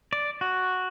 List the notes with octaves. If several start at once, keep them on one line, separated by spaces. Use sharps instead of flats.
D5
F#4